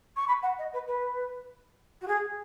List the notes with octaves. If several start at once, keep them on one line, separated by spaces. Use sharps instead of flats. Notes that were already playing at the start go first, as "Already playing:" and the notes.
C#6
B5
F#5
D#5
B4
B4
F#4
G#4